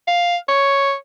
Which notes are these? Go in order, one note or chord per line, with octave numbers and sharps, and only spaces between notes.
F5
C#5